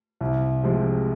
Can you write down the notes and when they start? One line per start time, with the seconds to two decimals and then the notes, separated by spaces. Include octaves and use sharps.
0.21 C2
0.63 C3 F3 G#3